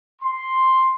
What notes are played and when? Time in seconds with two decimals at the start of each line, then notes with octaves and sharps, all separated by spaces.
0.22 C6